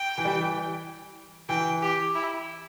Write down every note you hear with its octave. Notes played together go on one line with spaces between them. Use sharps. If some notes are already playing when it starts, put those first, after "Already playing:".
Already playing: G5
E3
G3
E3
E3 G5
G4
E4